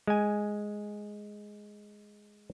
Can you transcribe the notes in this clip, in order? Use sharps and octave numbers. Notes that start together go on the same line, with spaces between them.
G#3 G#5